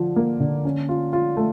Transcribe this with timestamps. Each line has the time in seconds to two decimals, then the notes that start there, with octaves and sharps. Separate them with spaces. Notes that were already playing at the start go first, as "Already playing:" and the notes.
Already playing: D3 F3
0.16 A#3
0.40 D3
0.65 C#4
0.89 F4
1.13 F4
1.37 A3